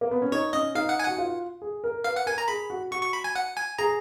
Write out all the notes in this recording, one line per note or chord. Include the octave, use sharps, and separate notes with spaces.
A#3
B3
C#4
D#4 C#5
C#4 D#5
D#4 F5
F#5
G#5
F#4 F#5
F4
G#4
A#4
B4 F5
F#5
A#4 G#5
A#5
G#4 B5
F#4
F#4 C#6
C#6
B5
G#5
F#5
G#5
G#4 A#5